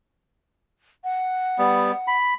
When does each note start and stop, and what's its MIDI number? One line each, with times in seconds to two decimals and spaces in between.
1.04 2.16 78
1.58 1.92 55
1.58 1.92 59
2.07 2.34 83